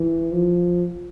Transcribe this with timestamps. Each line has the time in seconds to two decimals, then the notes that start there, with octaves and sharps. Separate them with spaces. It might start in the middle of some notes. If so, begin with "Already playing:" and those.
Already playing: E3
0.32 F3